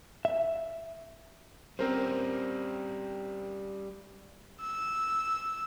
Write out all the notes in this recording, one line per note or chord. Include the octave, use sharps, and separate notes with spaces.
E5
G3 C4 C#4 A#4 C5
E6